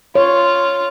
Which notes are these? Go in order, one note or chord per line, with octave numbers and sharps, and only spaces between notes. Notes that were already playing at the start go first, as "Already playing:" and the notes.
F4 C#5